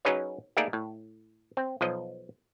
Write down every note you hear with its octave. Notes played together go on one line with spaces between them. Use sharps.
F#3 C#4 D#4 G#4 B4 C#5
A3 A#3 D#4 G#4 A#4 D5
A2
C4
B1 F3 D#5